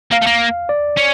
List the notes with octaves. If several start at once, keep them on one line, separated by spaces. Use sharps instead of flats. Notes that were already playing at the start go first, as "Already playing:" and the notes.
A#3 F5
A3
A#3
D5
C#4